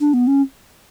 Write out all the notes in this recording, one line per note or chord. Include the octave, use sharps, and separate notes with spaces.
D4
B3
C#4